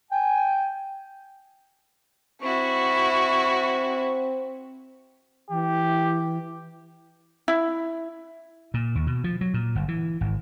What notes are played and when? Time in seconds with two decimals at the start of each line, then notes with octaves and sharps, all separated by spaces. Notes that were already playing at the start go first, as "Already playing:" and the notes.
0.11 G5 G#5
2.43 C4 E4 F#4 C#6
5.50 E3 G4
7.48 E4
8.74 A#2
8.95 D#2
9.07 B2
9.24 F3
9.41 F#3
9.54 A#2
9.75 G1
9.88 E3
10.21 G#1